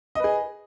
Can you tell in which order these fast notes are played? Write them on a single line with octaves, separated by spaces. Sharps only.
D#5 B4 G#4